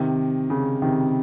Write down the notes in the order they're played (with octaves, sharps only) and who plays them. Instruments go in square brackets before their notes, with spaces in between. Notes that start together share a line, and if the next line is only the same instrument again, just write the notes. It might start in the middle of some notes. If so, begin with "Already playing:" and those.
Already playing: [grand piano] C3 D#3
C#3
C3 D#3